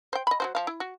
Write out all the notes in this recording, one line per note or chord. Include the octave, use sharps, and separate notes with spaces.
C5 G5
D#5 B5
F#3 F#4 C5
F3 F5
E4
F#4